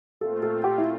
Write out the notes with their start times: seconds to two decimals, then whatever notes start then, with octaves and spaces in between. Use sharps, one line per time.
0.21 A#2 A3 C4 F4 A4
0.43 A4
0.64 G4
0.78 E4